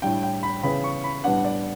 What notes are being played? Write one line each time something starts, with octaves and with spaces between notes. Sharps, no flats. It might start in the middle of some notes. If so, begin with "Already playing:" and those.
A2 G3 D4 G5
G5
B5
C#3 E3 B3 B5
C#6
B5
A2 G3 B3 D4 F#5
D5